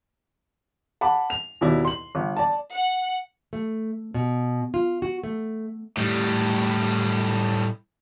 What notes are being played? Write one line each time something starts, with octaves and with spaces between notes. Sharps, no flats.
F#5 A5 B5 D6
F7
D#2 B2 E4 D5
C6 F#7
G1
D5 A5
F#5
A3
B2
F4
F#4
A3
A2 G3